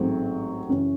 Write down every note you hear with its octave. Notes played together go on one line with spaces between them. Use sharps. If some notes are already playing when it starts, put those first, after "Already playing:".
Already playing: A1 G#2 F#3 A3 C4
F#2 C#3 E3 C#4 C#5